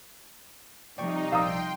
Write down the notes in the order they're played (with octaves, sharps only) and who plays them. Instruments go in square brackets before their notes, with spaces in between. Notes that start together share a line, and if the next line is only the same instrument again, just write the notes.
[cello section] C3 F3 G3 [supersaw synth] D#4 [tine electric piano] D5 G5 C#6
[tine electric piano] A#1 D5 E6 [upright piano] F5 A#5 D#6 [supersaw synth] G5 C6